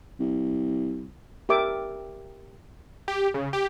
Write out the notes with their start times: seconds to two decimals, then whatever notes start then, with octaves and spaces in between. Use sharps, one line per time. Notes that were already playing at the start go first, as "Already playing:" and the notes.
0.20 C2
1.49 G4 A#4 E5 D6
3.08 G4
3.34 C#3
3.53 G4